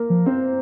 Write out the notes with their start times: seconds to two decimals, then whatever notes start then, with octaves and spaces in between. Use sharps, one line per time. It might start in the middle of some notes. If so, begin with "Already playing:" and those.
Already playing: A#3 A#4
0.10 F3
0.26 C4 C5